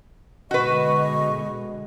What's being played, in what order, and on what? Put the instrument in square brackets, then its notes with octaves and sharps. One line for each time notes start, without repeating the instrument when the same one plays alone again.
[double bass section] B2 D3 G#3 [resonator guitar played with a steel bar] F#4 B4 [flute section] D#5 C#6